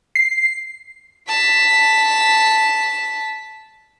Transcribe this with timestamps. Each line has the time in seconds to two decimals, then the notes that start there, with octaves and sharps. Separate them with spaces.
0.15 C7
1.28 A5 B6